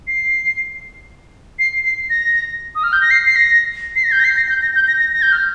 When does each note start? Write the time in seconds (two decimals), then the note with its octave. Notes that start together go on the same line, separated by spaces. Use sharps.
0.07 C7
1.59 C7
1.84 C7
2.10 A#6
2.75 D#6
2.84 F6
2.93 G6
3.01 A#6
3.11 C7
3.27 C7
3.36 A#6
3.96 C7
4.04 A#6
4.12 G6
4.20 A#6
4.24 C7
4.37 A#6
4.49 G6
4.62 A#6
4.75 G6
4.88 A#6
5.00 A#6
5.13 A#6
5.22 G6
5.32 F6